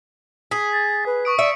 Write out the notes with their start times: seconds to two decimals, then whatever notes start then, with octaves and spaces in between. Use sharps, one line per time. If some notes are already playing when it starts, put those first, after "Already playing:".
0.51 G#4 B6
0.73 A6
1.06 B4
1.25 C#6 D#6 D7
1.39 D5 E5 C#7 D7